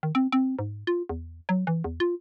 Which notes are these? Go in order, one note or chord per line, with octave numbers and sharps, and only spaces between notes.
D#3
C4
C4
G#2
F4
E2
F#3
E3
E2
F4